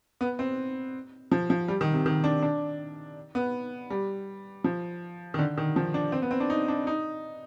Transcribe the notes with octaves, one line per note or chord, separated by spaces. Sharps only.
B3
C4
F3
F3
G3
D#3
C3
D#3
D4
D4
B3
G3
F3
D#3
D3
D#3
F3
D4
C4
B3
C4
D4
D#4
D4
D#4